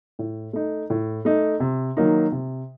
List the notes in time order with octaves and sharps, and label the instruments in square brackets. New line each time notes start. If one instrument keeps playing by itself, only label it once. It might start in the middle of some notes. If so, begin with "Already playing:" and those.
[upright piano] A2
A3 D#4
A2
A3 D#4
C3
D#3 F#3 A#3 D#4
C3